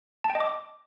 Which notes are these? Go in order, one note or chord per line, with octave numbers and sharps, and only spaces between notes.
A5
G5
D#5
D6